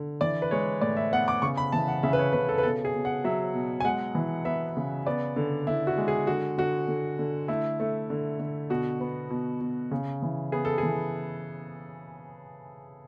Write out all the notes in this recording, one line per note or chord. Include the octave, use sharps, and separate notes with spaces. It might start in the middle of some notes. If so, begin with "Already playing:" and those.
Already playing: D3
E3 D5
B4
G#3 C#5
A2 D5
E5
B3 F#5
D6
C#3 C#6
B5
E3 A5
F#5
C#3 E5
B4
C#5
C#3 B4
A4
B4
B2 A4
G#4
B2
F#5
F#3 E5
B2
G#5
G#3 F#5
E3
B3 E5
C#3
B3 D5
D3
D3 E4
F#4
G#3
G#4
D3 F#4
D3 F#4
D3
D3
A3 E4
A3
D3
D3
B2 F#4
B3
B2
B2
C#3
E3
B3 G#4
A4
G#4
E3